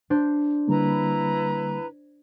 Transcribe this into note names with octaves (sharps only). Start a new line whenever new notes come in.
D4 C5
D3 G3 A#3 E4 B4 A#5